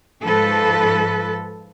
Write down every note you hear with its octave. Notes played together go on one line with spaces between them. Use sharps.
G#2 F3 A4 B4